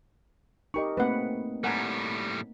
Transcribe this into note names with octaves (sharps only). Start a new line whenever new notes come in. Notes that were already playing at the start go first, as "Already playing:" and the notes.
D#4 G4 A#4 D#5 C#6
A3 A#3 C4 B4 F#5
A2 G3 A#4 F#5 G#5